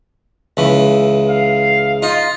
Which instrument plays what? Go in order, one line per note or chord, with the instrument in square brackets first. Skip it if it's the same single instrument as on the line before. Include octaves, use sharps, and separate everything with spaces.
[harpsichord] C#2 E3
[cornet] F5
[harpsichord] D#4 [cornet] F4